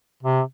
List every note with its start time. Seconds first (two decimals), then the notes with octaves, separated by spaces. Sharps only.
0.23 C3